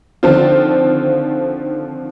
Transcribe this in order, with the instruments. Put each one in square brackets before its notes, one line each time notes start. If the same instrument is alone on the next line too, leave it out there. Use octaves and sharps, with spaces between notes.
[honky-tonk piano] D3 D#3 F3 C4 D4 F4